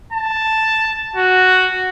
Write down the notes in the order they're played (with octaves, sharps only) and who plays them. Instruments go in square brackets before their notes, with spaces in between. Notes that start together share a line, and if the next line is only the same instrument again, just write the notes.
[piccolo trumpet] A5
F#4